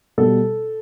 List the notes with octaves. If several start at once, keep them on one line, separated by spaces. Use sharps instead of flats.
B2 G3 A4